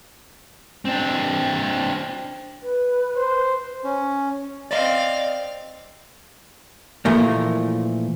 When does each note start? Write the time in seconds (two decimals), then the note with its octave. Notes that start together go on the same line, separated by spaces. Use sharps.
0.85 C4 D4
2.63 B4
3.16 C5
3.84 C#4
4.71 C4 D5 D#5 F5
7.05 A#2 E3 F3 A3 A#3